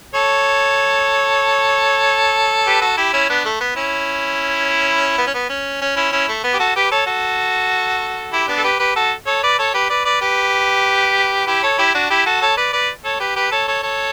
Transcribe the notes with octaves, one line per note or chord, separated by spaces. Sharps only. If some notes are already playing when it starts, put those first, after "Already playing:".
A4 C#5
G4 B4
F#4 A4
E4 G4
C#4 E4
B3 D4
A3
B3
C#4 E4
B3
C#4
B3
C#4
C#4
C#4 E4
C#4 E4
A3
B3
G4
F#4 A4
G4 B4
A4 C#5
F#4 A4
E4 G4
B3 D4
A4
G4 B4
G4 B4
F#4 A4
A4 C#5
B4 D5
A4 C#5
G4 B4
B4 D5
B4 D5
G4 B4
E4 G4
A4 C#5
E4 G4
D4 F#4
E4 G4
F#4 A4
A4 C#5
B4 D5
B4 D5
A4 C#5
G4 B4
G4 B4
A4 C#5
A4 C#5
A4 C#5